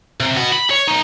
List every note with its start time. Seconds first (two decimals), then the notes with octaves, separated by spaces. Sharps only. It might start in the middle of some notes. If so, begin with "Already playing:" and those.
0.20 C3
0.37 B3 F#4
0.53 B5
0.70 C#5
0.87 B1 D#4